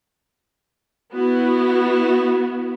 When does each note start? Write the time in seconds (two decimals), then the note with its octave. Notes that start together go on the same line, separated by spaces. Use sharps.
1.14 B3 E4 F#4